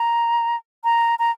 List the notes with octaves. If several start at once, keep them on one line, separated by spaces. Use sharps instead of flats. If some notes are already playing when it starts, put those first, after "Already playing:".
Already playing: A#5
A#5
A#5